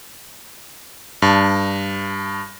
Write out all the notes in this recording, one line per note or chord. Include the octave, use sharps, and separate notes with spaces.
G2 A5